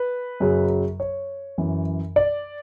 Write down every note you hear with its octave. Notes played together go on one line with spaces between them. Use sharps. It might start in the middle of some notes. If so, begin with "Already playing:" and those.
Already playing: B4
F#2 C#3 F#3
C#5
F#2 E3
D5